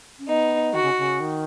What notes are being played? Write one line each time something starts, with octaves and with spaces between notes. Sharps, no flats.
C#4
B3 D#4
D#3 F#4
C#3
C#3
D#3